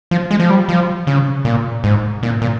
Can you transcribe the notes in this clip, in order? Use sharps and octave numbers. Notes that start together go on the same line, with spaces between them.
F3
G#3
F3
G3
F3
C#3
A#2
G#2
A#2
A#2